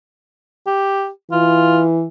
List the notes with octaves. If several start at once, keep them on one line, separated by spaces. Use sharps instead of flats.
G4
E3 F4